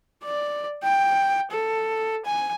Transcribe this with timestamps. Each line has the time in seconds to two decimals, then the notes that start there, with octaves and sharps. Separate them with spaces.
0.23 D5
0.83 G5
1.51 A4
2.25 G#5